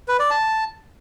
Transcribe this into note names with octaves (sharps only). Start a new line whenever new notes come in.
B4
D5
A5